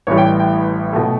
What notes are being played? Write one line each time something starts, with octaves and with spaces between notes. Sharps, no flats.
A1 A2 E3 G3 C#5
G5
G5
B2 F#3 A3